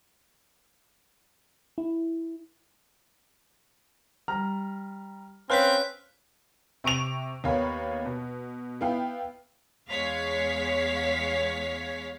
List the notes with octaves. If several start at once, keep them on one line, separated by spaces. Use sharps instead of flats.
E4
G3 A#5 F6
C4 C#4 B4 F5 F6 F#6 B6
C3 C#6 D7 F7
D#2 A#3 B3 C#5 F5 B5
B2
B3 E4 F5 G5
E2 G#3 C#5 F5 B6